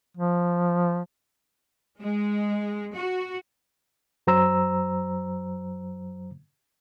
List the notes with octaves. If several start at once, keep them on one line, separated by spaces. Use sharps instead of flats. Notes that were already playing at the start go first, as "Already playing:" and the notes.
F3
G#3
F#4
F#2 F#3 C5 A#5 E6